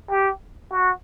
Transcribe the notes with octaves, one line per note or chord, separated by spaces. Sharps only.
G4
F#4